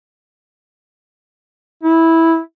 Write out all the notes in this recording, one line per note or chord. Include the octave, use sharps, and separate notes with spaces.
E4